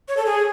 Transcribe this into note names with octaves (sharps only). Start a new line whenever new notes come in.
C#5
A4
G#4